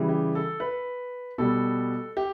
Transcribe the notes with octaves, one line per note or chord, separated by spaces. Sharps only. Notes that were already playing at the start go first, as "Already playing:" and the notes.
Already playing: C#3 E3 G3
G4
A4
B4
B2 G3 A4
G4